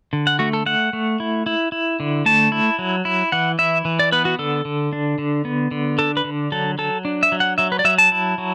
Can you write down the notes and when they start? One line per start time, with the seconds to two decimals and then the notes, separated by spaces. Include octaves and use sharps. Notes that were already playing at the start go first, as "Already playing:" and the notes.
0.13 D3
0.27 F#5
0.39 A3 F#4
0.53 A4
0.66 A3 F#5
0.93 A3
1.20 E4
1.46 E4
1.72 E4
2.00 D3
2.26 A3 A5
2.52 E4
2.79 F#3
3.05 E4
3.32 E3 F#5
3.59 E4 E5
3.85 E3
3.99 D5
4.12 B3 B4
4.25 F#4
4.39 D3 A4
4.65 D3
4.93 D4
5.18 D3
5.45 B3
5.71 D3
5.98 D4 A4
6.17 B4
6.25 D3
6.52 F#3 A4
6.78 F#3 A4
7.05 D4
7.23 E5
7.32 F#3
7.40 F#5
7.58 F#3 E5
7.72 B4
7.79 D5
7.85 F#3 E5
7.98 A5
8.12 E4
8.38 F#3